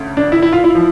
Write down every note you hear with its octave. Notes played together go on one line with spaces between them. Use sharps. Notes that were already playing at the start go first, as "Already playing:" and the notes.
Already playing: D2 C#3
D4
E4
E4
F4
E4
F3